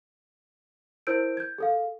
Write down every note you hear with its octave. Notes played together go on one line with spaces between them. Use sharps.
E4 A#4 C5 E6 G6 D7
G6 G#6
G#4 A4 F5